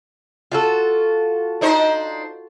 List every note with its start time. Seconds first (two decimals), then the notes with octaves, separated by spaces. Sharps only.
0.52 F4 F#4 A4
1.61 D4 D#4 C5